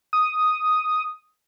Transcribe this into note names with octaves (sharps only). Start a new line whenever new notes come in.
D#6